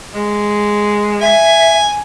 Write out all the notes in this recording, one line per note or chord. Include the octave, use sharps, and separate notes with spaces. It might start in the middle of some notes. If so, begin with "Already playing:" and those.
G#3
E5 G#5